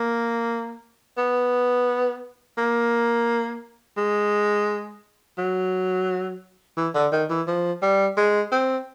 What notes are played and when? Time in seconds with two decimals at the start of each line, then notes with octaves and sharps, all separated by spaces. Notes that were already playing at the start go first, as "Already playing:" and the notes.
Already playing: A#3
1.18 B3
2.58 A#3
3.97 G#3
5.38 F#3
6.77 E3
6.95 D3
7.12 D#3
7.30 E3
7.48 F3
7.82 G3
8.17 G#3
8.52 C4